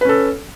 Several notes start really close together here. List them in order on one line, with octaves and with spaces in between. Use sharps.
B4 C#4 A4